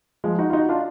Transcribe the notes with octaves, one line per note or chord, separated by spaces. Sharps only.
F3 G#3
D#4 F#4
F4
D#4 F#4
D4 F4